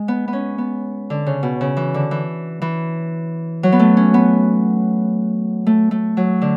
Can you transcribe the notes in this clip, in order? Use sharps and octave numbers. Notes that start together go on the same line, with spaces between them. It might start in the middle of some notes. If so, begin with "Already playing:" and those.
Already playing: G#3
B3
B3
C#4
B3
D3
C#3
B2
C#3
E3
D3
E3
E3
F#3
B3
A3
C#4
B3
A3
A3
F#3
D3